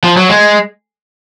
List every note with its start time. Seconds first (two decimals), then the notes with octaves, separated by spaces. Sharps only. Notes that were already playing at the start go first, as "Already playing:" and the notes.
0.04 F3
0.17 F#3
0.29 G#3